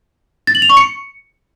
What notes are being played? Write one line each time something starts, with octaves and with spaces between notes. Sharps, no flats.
A6
F#7
F7
C#6
C#7